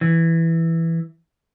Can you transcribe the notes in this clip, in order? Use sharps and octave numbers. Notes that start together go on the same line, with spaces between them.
E3